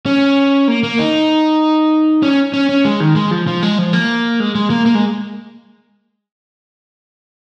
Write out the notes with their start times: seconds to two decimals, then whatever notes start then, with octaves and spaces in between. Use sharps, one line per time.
0.06 C#4
0.68 A#3
0.83 A#3
0.99 D#4
2.23 C#4
2.54 C#4
2.69 C#4
2.85 G#3
3.00 D#3
3.16 G#3
3.31 F3
3.47 F3
3.63 G#3
3.78 F3
3.93 A#3
4.40 G#3
4.55 G#3
4.70 A#3
4.86 A#3
4.95 G#3